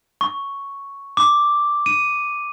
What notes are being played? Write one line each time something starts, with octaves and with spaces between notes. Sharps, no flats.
C#6
D6
D#7